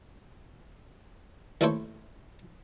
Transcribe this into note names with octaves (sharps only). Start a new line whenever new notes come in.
D#2 A3 E4 A4 C5 C#5